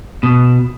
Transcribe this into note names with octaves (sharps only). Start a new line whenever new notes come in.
B2